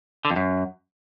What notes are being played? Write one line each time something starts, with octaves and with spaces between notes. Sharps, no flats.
D3
F2
F#2